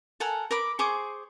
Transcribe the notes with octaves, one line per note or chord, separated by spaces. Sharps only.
A4 A#4 F#5 G#5
A#4 B5 D6
G#4 C5 C#6 D6